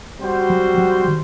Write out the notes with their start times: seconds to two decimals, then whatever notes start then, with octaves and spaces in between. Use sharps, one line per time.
0.20 G3 C4 F#4 C5
0.50 F#3
0.78 F#3
1.08 D#3